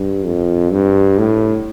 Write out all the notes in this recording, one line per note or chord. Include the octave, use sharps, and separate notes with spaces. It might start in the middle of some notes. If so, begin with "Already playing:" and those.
Already playing: G2
F2
G2
A2